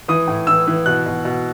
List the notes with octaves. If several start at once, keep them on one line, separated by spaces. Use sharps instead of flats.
E3 D#6
A2
E3 E6
E3
B2 F#6
B2
B2